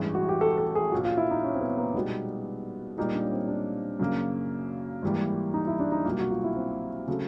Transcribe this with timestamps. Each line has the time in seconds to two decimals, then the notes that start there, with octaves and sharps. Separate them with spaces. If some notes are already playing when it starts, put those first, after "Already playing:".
Already playing: A1 G2 E3 G#3
0.15 F#4
0.29 G4
0.41 A4
0.58 A4
0.75 G#4
0.92 A#1 A#2 F3 F#4
1.05 F4
1.17 E4
1.31 D#4
1.44 C#4
1.54 C4
1.61 B3
1.77 A#3
1.94 B2 G3 G#3 B3 D#4
2.97 A#2 G3 G#3 A#3 D#4
3.14 D4
3.22 C#4
3.32 C4
3.48 D4
3.99 F#2 C#3 F#3 A#3
5.02 G#1 G#2 E3 G3 A#3
5.54 D#4
5.67 E4
5.80 D4
5.92 D#4
6.05 C2 B2 F#3 A#3 F4
6.19 F#4
6.31 F4
6.44 E4
6.56 C4
7.07 C#3 F#3 A3